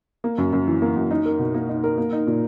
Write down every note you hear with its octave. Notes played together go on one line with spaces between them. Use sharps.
A#3
F#2
F#2
E3
A#3
F#2
D#4
A#4
B2
A#3
D#4
A#4
A#3
D#4
A#2